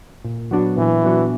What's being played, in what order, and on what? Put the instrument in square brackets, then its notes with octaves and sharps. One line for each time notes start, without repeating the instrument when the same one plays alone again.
[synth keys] A#2
F#3 B3 D4 F#4
[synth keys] A#2 [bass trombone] E3
[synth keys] F#3 B3 D4 F#4